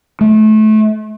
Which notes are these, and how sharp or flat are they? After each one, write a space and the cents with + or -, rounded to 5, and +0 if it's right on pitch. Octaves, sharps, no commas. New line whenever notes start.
A3 -25